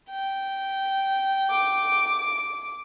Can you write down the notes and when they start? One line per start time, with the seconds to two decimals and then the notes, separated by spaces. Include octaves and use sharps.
0.10 G5
1.50 D6